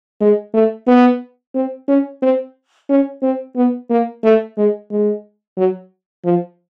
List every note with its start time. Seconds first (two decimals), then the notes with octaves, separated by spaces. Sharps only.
0.21 G#3
0.54 A3
0.88 B3
1.55 C4
1.88 C#4
2.22 C4
2.90 C#4
3.22 C4
3.56 B3
3.90 A#3
4.24 A3
4.58 G#3
4.91 G#3
5.57 F#3
6.24 F3